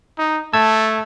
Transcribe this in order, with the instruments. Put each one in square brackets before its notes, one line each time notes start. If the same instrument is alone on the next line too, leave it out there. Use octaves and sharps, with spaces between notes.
[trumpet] D#4
[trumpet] A3 [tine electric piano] A5 E6 G#6